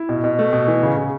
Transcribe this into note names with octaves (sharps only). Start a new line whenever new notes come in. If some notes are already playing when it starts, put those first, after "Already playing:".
Already playing: E4
B2
B2
A3
B2
E3
C#3
C#3